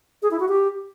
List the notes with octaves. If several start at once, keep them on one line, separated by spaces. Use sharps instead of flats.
G#4
E4
F#4
G4